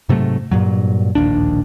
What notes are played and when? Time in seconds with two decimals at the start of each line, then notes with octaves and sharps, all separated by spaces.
0.09 G#2 C3 F#3 A3
0.51 G2 A#2 F#3
1.15 D1 A#1 D#2 D4